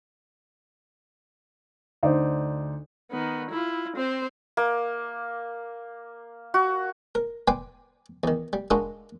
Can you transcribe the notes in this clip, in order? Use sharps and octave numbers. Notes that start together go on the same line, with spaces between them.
D2 D#4 C5 D5
D#3 B3
E4 F4
C4 C5
A#3
F#4
A#4
B4 D5 G5 G#5 C6
E2 D#3
G3
G#3 A#3 D4 D#4 F4 F#4